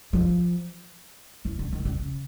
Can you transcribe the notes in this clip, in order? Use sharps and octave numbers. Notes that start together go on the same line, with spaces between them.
F3
E3
D3
D#3
D3
C#3